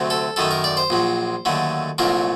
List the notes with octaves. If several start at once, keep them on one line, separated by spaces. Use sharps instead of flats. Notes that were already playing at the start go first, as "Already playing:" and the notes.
Already playing: D2 C3 F#3 A3
A4
F#2 D#3 A3 A4
A#4
D5
C5
A#1 A#2 F#3
D#2 D3 F#3 A3
C2 A#2 F#3 A3 A#4